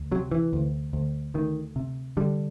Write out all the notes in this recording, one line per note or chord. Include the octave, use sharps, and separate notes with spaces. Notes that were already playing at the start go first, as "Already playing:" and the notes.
Already playing: D2
C3 F#3
E3
D2
D2
D2 D#3
C3
D3 G3